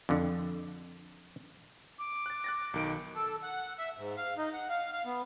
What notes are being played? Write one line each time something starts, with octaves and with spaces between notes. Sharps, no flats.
F2 D3
D6
F#6 A6
F#6 A6 A#6
B1 D#3 D7
A4
F#5
E5
G#2
F5
D#4
F#5
F5
F5
B3